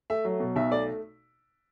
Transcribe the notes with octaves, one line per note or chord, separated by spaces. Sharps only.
A3 E5
F#3
B2
B1 E5
A3 D5